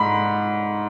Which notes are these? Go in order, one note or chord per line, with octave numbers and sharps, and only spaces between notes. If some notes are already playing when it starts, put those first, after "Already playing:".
Already playing: G#2 B5